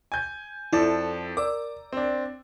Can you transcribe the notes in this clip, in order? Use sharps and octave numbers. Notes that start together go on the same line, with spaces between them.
G#5 G6
F2 E4 A4 D5
A#4 D5 D6 E6
C4 D4